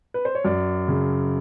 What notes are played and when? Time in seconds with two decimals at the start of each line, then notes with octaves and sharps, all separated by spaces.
0.14 B4
0.25 C5
0.35 C#5
0.45 F#2 D5
0.88 C#3